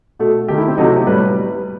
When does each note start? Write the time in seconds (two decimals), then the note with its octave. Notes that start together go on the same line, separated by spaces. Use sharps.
0.19 B2 A3
0.48 D#3 A3 G4
0.58 E4
0.68 C4
0.78 C3 F#3 A3 D#4
0.97 G4
1.07 A2 G3 B4